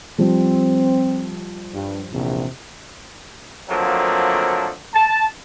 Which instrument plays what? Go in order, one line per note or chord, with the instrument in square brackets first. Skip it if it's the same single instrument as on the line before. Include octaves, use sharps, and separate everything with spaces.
[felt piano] F3 G3 [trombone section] C4
[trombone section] G2
A#1 E2 C3
[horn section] D3 F3 F#3 A3 A#3 C4
A5